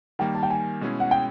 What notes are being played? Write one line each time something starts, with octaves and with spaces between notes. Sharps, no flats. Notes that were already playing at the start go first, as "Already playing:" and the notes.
D#3 G3 A#3 G5
A5
G5
G#5
B2 G#3 C#4 E4 G#4
F#5
G5